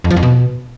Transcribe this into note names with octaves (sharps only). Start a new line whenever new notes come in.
F2
F3
F2
B2